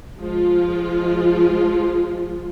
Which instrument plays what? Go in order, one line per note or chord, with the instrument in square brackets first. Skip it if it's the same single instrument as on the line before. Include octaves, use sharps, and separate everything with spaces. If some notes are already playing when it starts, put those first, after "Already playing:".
[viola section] F3 G#3 F4